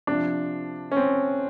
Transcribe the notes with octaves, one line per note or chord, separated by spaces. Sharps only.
C3 F3 D4
C#4
C4